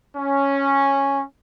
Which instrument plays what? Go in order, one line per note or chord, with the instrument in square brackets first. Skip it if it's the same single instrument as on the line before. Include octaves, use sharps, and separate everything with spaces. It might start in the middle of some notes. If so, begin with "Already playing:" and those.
[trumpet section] C#4